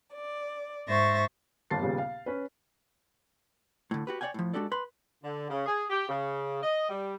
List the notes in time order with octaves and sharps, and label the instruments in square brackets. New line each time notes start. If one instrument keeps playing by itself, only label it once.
[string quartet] D5
G#2 C5 E5 C#6 A6 A#6
[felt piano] G1 D#2 A#3 A5 A6 C7
D#2 A#2 C#3 G3 B3
F5
C#4 B4
[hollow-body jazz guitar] A2 D3
F#4 G4 B4
C#5 D5 F5 G5 G#5
A2 F3
G#3 D4 F#4 G4 A4 D5
B4 C6
[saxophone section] D3
C#3
G#4
G4
C#3
D#5
G3